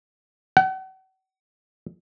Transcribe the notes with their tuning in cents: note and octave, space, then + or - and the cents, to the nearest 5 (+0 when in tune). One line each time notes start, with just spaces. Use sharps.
F#5 +40